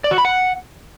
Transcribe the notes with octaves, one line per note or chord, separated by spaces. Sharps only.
D5
F#4
B5
F#5